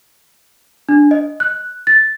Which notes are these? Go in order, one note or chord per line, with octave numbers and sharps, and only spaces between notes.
D4
D#5
F#6
A6